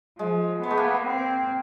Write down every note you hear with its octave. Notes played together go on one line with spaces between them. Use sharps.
F3 G#3
G#3 B3
A3
A#3
C4